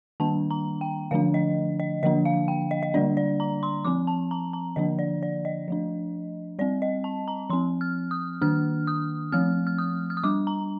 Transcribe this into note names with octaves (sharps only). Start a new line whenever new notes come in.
D#3 G3 A#3 D4 A5
A#5
G5
D3 F3 A3 D4 F5
D#5
D#5
D3 F3 A#3 D4 D#5
F5
G5
D#5
D#5
D3 G3 A#3 D4 D5
D5
A#5
C6
F3 C4 D6
A5
A#5
A#5
D3 F3 A#3 D4 D#5
D5
D5
D#5
F3 A3 D4
G3 C4 D5
D#5
A5
A#5
F3 C4 C6
F6
D#6
D#3 A#3 D4 F6
D#6
F3 A3 C4 F6
F6
D#6
F6
D#6
G3 D4 D6
A#5